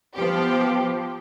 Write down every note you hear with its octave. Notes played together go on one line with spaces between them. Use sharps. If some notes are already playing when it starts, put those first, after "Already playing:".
F3 B3 G4